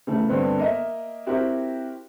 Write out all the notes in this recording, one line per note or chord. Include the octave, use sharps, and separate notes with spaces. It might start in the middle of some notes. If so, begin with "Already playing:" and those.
C#3 E3 A3
G2 D3 B3 C4
A#3 A#4 D#5 E5
C4 E4 F#4 G4 A#4